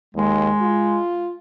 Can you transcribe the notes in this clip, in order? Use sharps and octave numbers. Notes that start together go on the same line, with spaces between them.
D#2 G#3
F4